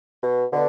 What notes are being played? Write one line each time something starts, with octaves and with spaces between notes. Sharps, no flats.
B2
B2 D3